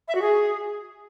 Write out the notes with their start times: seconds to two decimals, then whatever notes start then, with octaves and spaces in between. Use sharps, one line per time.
0.08 E5
0.15 F#4
0.21 G#4